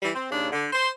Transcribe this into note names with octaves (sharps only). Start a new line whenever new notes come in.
E3 G3
C4
D#2 C#3 D4
D3
C5